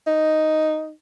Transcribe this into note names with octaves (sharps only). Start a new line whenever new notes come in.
D#4